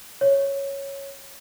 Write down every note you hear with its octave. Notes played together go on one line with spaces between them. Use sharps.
C#5